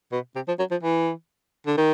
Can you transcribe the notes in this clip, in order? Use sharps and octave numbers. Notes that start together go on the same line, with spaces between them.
B2
C3
F3
F#3
F3
E3
D3
D#3